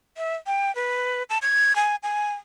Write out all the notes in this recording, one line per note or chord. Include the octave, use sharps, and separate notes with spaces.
E5
G5
B4
A5
G#6
G#5
G#5